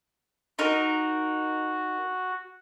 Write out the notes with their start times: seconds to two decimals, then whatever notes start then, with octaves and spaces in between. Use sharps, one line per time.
0.59 D#4 F#4 A#4